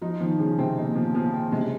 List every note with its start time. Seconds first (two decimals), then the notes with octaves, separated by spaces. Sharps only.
0.02 F3 D#4
0.20 D#3 F3
0.39 C#3 F3
0.58 C3 C4
0.77 A#2 D#4
0.96 F3
1.15 F3
1.33 C4
1.52 C3 G#3
1.60 C#3